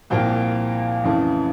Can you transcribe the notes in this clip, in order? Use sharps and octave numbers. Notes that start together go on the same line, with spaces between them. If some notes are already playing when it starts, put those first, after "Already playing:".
C2 A#2 F3 A#3 F5 G5
F2 C#3 E3 A3